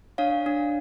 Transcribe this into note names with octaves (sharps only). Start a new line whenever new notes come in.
D4 C#5 F5
D4